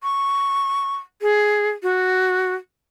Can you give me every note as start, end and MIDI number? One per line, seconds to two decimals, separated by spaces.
0.03 0.95 85
1.22 1.69 68
1.83 2.53 66